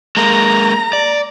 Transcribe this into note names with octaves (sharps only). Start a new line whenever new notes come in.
G#3 A#3 A#5
D5